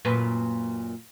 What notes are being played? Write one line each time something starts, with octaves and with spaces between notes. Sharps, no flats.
F#2 A#2 B4